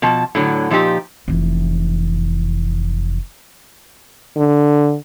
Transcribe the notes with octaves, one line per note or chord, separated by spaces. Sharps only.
B2 F3 A5
A2 D3 F#3
A#2 F3 D#4 G4 A#5
F1 E3
D3